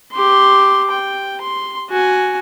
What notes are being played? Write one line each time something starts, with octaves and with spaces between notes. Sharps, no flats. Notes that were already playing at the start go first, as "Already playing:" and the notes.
G4 C6
G5
C6
F#4 G#5